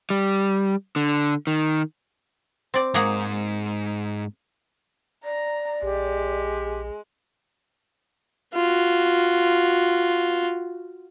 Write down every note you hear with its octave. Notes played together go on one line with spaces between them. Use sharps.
G3
D3
D#3
C4 D5
G#2 A#3 G#4 F#5
D5 A#5
A#1 G#3 G4
F4 F#4